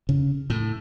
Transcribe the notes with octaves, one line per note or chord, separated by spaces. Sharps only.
C#3
A2